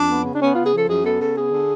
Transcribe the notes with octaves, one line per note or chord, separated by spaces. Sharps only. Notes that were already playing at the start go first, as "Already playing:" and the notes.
Already playing: F2 D4
B3
C#3
D4
B3 C#4
C#3 F4
G#4
F3 A4
F#2 G#4
B3 A4
C#3 A4
B3 G#4
D3